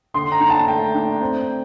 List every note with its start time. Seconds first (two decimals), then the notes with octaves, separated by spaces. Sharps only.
0.14 D3 C6
0.32 A#5
0.40 D4
0.50 A5
0.68 A3 G5
0.95 D4
1.21 C4